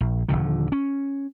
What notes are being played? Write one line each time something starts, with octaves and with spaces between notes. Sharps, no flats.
A#1
D#1 C2 D3 F3
C#4